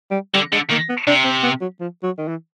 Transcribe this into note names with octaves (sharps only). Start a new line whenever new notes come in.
G3
D3 G3
D3 G#3
D#3 A#3
B3
C3 D4
C4
B3
F#3
F3
F#3
D#3
E3